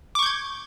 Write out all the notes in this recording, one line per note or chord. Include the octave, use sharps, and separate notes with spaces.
C#6 D6 G6 G#6